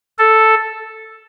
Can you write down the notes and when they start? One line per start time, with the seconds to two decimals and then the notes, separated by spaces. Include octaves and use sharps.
0.18 A4